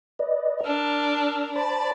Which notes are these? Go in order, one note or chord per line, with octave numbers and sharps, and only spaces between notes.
B4 D5 D#5
D4 A#4 E6 F6
C5 D5 A5 B5